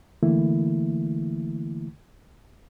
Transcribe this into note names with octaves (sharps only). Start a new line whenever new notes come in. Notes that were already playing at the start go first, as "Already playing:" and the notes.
D3 E3 A3 A#3 E4